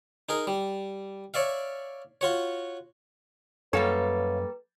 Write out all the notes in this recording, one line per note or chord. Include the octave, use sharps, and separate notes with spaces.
D#4 G#4 A#4
G3
C#5 D5 E5 F5
F4 F#4 C#5
F#2 G3 A#3 A4 B4 C#5 F5